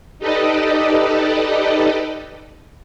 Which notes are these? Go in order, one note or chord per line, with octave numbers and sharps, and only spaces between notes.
D#4 G4 A4 B4 D5 D#5